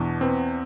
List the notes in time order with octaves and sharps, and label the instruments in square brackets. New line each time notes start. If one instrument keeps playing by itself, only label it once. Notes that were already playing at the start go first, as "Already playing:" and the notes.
Already playing: [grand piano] E2 B2 [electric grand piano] D4
[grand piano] B3 [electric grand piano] C4